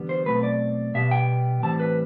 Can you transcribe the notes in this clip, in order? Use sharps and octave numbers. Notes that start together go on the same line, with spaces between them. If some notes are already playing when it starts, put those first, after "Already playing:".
Already playing: E2 D3 G3 B3
C5
B2 F#3 A3 C4 B4
D5
B2 G3 B3 E5
G5
A2 E3 G3 C4 A5
B4